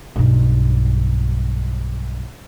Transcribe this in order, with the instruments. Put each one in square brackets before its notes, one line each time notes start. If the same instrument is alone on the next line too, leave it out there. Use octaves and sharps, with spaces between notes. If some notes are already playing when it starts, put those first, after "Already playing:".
[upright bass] B1 G2